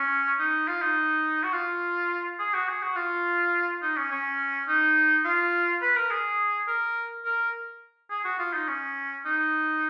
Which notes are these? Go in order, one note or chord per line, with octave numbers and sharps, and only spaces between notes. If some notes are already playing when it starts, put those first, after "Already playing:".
Already playing: C#4
D#4
F4
D#4
F#4
F4
G#4
F#4
G#4
F#4
F4
D#4
C#4
C#4
D#4
F4
B4
A#4
G#4
A#4
A#4
G#4
F#4
F4
D#4
C#4
D#4